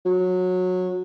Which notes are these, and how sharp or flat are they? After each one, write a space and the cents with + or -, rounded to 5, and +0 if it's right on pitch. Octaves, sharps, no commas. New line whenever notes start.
F#3 -20